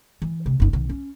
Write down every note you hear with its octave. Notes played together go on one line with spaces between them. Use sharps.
E3
D2 C3
F#1 D#4
B1 D#3
C#4